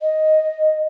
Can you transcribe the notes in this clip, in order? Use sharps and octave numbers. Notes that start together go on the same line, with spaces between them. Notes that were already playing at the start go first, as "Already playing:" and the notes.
D#5